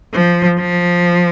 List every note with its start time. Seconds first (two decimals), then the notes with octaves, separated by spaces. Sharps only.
0.14 F3
0.59 F3